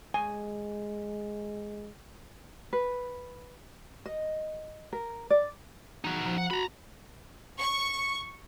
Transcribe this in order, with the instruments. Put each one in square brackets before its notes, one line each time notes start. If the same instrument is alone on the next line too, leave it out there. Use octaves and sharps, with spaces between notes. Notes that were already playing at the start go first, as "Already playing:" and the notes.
[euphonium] G#3 [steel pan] G#5
[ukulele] B4
D#5
A#4
D5
[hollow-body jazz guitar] E2 [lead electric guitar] D#4 F#4
[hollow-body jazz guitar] F3 A#5
[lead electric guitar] F#5
[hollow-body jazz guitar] F#4 [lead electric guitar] A#5 B5
[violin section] C#6